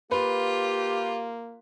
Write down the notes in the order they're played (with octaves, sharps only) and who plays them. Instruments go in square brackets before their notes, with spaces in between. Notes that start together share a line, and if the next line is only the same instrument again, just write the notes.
[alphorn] A#3 [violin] F4 [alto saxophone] G4 [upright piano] B4